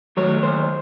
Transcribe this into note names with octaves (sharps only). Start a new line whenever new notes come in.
D#3 F#3 A3 C#5
D#2 C5